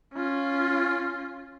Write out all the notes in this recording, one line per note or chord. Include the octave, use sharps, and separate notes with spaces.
C#4 F4